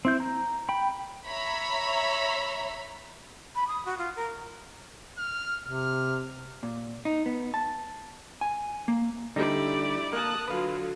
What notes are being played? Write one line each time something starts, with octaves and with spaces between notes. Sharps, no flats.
C4 E4 G6
A#5
G5 B5
C#5 E5 A#5 B5
B5
D#6
F#4
F4
A#4
F6
C3 F6
A#2
D#4
B3
A5
G#5
A#3
D3 G3 D#4 E4 G4 D5
A#3 A#4 A5 D#6 F#6
D3 F#3 F4 B4 F5